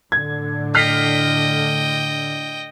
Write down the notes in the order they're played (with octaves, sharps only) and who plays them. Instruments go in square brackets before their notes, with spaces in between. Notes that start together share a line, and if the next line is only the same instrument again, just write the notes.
[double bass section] A2 D3 [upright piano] G#6
[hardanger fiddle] D#5 G5 [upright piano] F6 B6 C7